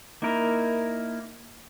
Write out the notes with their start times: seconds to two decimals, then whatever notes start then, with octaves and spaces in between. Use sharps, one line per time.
0.22 A#3 D#4 E4 A#4